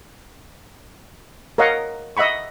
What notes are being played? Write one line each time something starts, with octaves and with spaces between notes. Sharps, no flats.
A#4 C#5 D#5 F5 F#5
D#5 E5 F#5 B5 C#6